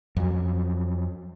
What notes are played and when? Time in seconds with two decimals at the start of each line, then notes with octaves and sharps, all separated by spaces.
0.17 F2 F#3